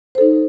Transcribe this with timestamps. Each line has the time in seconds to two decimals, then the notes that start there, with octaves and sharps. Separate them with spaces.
0.15 C5
0.18 A4
0.21 D#4